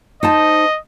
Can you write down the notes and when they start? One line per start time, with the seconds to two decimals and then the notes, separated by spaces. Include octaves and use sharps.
0.23 D#4 C5 D#5 A5